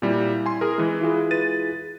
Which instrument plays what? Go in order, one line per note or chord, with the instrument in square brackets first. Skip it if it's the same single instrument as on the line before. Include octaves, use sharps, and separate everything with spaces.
[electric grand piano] A#2 G3 [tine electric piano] C4 E4
[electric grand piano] G#5 C6
G#4 A#4
E3 G#3
[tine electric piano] E4 F4 G#4
[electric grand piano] B4 A6 D#7